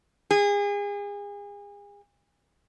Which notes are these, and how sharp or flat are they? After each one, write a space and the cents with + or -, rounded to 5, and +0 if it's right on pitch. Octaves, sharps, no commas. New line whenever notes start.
G#4 -35